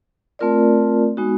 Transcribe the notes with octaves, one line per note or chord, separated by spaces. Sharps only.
A3 C4 F4 A#4 D5
G#3 B3 D#4 F#4